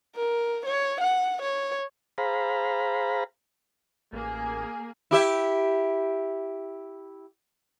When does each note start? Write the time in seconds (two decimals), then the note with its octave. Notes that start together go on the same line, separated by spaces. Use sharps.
0.16 A#4
0.66 C#5
1.01 F#5
1.42 C#5
2.18 G#4 C5 F5 A#5 B5
4.13 A1 A#3 G#4
5.11 E4 G4 E5